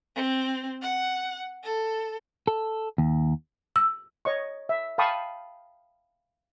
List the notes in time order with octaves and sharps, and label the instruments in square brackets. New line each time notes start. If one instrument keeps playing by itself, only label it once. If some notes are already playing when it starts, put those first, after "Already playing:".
[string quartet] C4
F#5
A4
[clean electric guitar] A4
D#2
[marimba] E6
[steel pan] C#5 D#5 C#6
E5
F5 G5 A5 B5 C#6 D#6